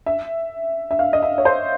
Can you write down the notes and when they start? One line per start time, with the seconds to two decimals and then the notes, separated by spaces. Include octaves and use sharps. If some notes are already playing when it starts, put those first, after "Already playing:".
0.06 E5
0.91 E5
0.99 F5
1.13 D#5
1.23 E5
1.38 C#5
1.45 C5